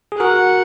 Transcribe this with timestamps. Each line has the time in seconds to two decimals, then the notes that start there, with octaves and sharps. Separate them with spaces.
0.12 G#4
0.20 F#4 A#4 F#5